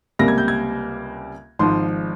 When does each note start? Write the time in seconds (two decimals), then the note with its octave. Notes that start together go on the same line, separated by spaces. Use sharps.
0.19 C#2 C3 G3 A#3 A#6
0.28 G#6
0.38 G6
0.48 G#6
1.59 G#1 G#2 F3 C6